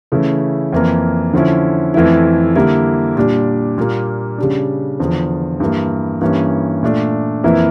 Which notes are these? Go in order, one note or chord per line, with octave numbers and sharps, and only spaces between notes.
C#3 E3 A3 C#4 E4
F2 E3 A#3
D3 F3 C#4 E4
F2 E3 A3 E4
D3 G3 A#3 E4
A#2 G3 D4
A#2 G3 A#3
C#3 G3 D4
E2 D3 F3
G2 E3 A#3
G2 E3 A#3 C#4
A#2 A3 D4
F2 E3 A#3 E4